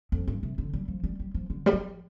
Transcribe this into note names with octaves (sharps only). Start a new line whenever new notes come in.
F2
G2
C3
D3
G3
F3
G3
G3
F3
D3
G3
F3